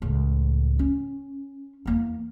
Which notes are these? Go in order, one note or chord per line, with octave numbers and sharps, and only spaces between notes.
C#2 A2
C#4
E2 A#3